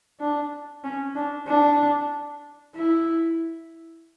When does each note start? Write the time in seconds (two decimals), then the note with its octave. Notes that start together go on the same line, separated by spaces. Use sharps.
0.20 D4
0.84 C#4
1.15 D4
1.47 D4
2.75 E4